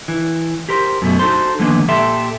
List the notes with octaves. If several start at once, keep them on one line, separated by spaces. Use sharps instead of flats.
E3
G4 A#4 C5
F#2 B2 A3
D#4 F#4 A4 C5
D3 D#3 F3 G#3 A#3 B3
A#2 G4 A4 E5 C6